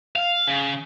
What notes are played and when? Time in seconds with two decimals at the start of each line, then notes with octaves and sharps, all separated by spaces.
0.16 F5
0.48 C#3